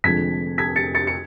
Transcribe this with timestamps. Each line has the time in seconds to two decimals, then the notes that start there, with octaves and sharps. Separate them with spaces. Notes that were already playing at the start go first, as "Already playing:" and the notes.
0.04 F1 F2 D3 G#3 G#6 B6
0.58 G#6 B6
0.76 A6 C#7
0.95 A6 C#7
1.07 C#7